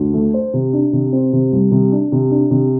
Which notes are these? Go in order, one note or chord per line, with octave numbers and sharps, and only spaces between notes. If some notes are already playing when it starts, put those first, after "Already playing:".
Already playing: D2
A3
C5
C3
D4
C3
C4
C3
C2
C3
D4
C3
D4
C3